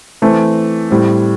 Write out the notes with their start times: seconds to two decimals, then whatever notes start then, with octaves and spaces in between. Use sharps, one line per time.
0.22 E3 A3 C4
0.90 A2 G3 C4